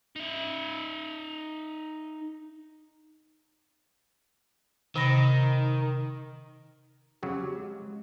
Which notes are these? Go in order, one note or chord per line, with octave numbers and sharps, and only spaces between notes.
D#4 E5
C3 D#3 B5 A#6
F2 C#3 F#3 G4
G#3